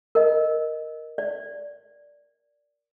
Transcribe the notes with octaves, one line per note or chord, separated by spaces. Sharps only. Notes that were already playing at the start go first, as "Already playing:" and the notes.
A#4 D#5
D5